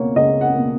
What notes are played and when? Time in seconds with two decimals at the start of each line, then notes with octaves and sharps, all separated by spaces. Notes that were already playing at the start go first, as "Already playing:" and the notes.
Already playing: C#2 B2 A#3 C#5
0.16 C#2 D#5
0.41 F#5
0.54 B2 A#3